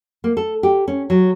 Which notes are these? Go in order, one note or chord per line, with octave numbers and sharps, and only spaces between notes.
A#3
A4
G4
C#4
F#3